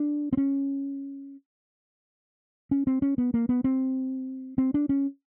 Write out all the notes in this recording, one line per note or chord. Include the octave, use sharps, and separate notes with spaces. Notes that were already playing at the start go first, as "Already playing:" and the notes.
Already playing: D4
C4
C#4
C#4
C4
C#4
B3
A#3
B3
C4
C4
D4
C#4